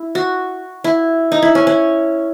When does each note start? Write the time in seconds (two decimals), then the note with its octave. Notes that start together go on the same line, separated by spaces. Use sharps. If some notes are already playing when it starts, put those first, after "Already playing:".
Already playing: E4
0.15 F#4
0.84 E4
1.32 D#4
1.42 E4
1.55 C#4
1.67 C#4